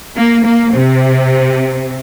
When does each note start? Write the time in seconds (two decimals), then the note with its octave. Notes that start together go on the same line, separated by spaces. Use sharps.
0.17 A#3
0.45 A#3
0.73 C3